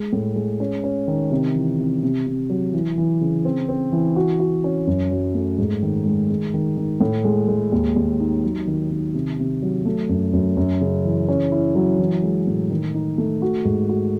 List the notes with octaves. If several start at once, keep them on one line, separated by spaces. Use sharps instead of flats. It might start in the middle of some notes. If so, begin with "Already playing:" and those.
Already playing: G#3
A2
G#3
C#4
C#4
D#3
C3
E3
C3
C3
C3
F#3
E3
E3
C#3
C4
C4
E3
F#4
F#4
C#4
F#2
F#3
A3
G#2
D#3
G#3
G#3
D#3
D#3
A2
G#3
G#3
D#2
D#2
D#4
F#3
D#3
D#3
C3
C3
F#3
A3
F#2
F#2
F#2
C#3
E3
C#4
E4
F#3
E3
G#3
A2
D#3
D#4
A3
F#4
G#2
F#4